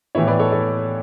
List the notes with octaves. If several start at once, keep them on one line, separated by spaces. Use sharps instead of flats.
A2 E3 B3 E4 C#5 E5
B4 D5
A4 C#5
A4 C#5